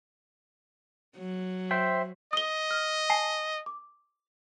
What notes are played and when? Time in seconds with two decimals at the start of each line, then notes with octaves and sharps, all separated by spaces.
1.17 F#3
1.71 C5 E5 G5
2.33 D#5 D#6 G7
2.71 F6
3.10 G#5 A5 C7
3.66 D6